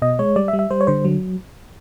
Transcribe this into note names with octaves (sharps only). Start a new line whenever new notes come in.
B2 D#5
G#3 C#5
G3 D5
E5
G3
E5
G3 C5
C#5
D3 C5
F#3